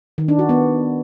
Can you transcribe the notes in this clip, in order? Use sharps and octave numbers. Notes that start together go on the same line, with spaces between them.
D#3
D4
F#4
B3